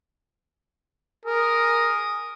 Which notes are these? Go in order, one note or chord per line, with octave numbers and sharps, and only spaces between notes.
G#4 A#4 D#6